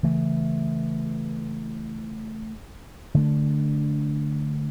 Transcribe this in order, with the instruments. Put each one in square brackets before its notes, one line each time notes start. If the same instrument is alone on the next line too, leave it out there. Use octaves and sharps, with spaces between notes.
[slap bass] C#3 E3 A3
D3 A3 D4